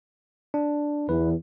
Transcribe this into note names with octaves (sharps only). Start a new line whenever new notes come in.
D4
E2 B4